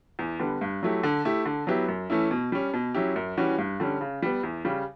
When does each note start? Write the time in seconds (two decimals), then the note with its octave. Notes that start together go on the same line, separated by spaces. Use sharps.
0.19 E2
0.39 D3 G3 B3
0.61 G2
0.83 F#3 A3 E4 G4
1.03 D3
1.25 A3 E4 G4
1.46 D3
1.67 F#3 B3 E4 G4
1.88 F#2
2.10 E3 A3 C#4 E4
2.31 B2
2.52 G3 C#4
2.74 B2
2.95 F#3 C#4 E4 G4
3.16 F#2
3.37 E3 G3 C#4 F#4
3.58 G2
3.80 D3 G3 C#4
4.01 C#3
4.22 G3 B3
4.43 E2
4.65 C#3 G3